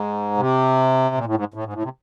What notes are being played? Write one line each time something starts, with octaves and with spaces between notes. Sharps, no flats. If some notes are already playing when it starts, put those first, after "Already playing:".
Already playing: G#2
C3
A#2
A2
G#2
A2
G#2
A2
C3